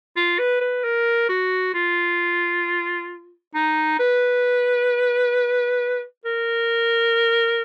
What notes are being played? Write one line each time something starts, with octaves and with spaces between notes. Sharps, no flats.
F4
B4
B4
A#4
F#4
F4
D#4
B4
A#4